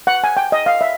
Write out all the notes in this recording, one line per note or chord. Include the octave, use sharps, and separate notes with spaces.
F#5
G#5
G5
D#5
F5
E5